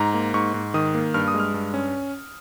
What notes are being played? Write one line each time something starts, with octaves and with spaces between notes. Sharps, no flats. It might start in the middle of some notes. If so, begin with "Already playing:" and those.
Already playing: G#2 A#5
A#3
G#2 C#6
G#2
D#3 D#6
A#3
G2 F6
D#6
G#3
F6
G2
C#4